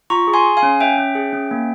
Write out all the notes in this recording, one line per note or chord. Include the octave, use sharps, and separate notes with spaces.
F4 A#5 C#6
G#4
G#5 C6
G#4
F5 G#5
C#4
C#4 E5 G5
C#4
G#4
C#4
A#3